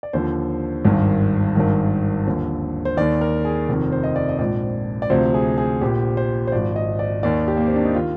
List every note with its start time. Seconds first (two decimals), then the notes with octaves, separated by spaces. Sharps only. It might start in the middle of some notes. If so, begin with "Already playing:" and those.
0.03 D5
0.13 D#2 D3 F3 C5
0.84 G#1 G2 D#3
1.55 G#1 G2 D#3
2.26 D#2 D3 F3
2.85 C5
2.97 D#2 D#3 D5
3.21 A#4
3.45 G#4
3.69 F1 F2 D#3
3.92 C5
4.04 D#5
4.16 D5
4.29 D#5
4.39 A#1 G#2 F3 D5
5.02 D5
5.10 D2 C3 F3 C5
5.34 G#4
5.58 G#4
5.81 A#1 A#2 F3 G4
6.17 C5
6.47 C5
6.52 G#1 G#2 F3 D5
6.76 D#5
6.99 D5
7.23 D#2 D#3 D5
7.48 G4
7.57 A#3
7.67 C4
7.76 D4
7.85 D#4
7.95 D#3 F4